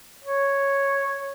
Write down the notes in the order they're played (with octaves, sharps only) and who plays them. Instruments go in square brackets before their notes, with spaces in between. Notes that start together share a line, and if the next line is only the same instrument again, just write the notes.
[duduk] C#5